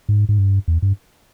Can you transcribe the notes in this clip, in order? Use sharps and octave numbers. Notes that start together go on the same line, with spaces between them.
G#2
G#2
G2
E2
G2